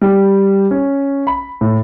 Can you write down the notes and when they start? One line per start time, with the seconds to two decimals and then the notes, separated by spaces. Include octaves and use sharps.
0.02 G3
0.71 C#4
1.27 B5
1.61 A2